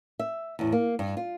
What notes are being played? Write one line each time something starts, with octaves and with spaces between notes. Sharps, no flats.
E5
E2 A2
A#3
G2
F4